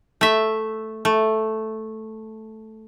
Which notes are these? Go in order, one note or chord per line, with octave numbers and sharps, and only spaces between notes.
A3 E5
A3